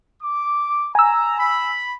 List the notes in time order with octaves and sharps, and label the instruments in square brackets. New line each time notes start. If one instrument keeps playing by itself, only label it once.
[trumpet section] D6
[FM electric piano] G#5 E6 [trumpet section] A#5
[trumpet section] B5